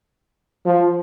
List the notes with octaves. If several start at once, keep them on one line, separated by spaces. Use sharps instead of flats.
F3